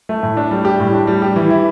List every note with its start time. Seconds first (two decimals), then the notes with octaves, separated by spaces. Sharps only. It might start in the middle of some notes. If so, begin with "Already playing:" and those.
0.09 A3
0.23 A2
0.37 D4
0.51 G3
0.65 G4
0.80 A2
0.94 D4
1.07 G3
1.22 G4
1.36 E3
1.50 E4